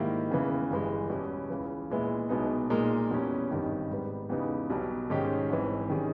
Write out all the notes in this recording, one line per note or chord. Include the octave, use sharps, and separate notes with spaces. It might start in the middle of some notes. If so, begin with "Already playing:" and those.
Already playing: G#2 D#3 G3 A#3 E4
E2 C#3 E3
G1 G2 E3 G#3
E2 B2 G3 C#4
C#2 C#3 E3
A#2 G#3 B3 E4
B1 B2 G#3 B3 D#4
A#2 G#3 D#4 A#4
E2 B2 G3 C#4
G#1 G2 D#3 G3
G#2 G3 B3
E2 C#3 G3 B3 D#4
B1 B2 G3
G#2 D#3 G#3 C#4 G4
G#1 G#2 E3
D#3 G3 C#4 G#4